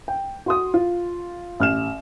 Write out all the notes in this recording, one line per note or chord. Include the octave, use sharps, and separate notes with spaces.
G5
F#4 C6 D#6
F4
A1 F6 E7